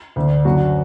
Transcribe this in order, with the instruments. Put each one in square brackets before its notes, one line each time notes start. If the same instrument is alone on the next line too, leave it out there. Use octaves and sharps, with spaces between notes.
[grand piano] D2 D3
F#2 D3 F#4